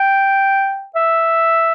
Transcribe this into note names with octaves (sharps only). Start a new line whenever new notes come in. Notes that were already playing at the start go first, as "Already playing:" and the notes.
Already playing: G5
E5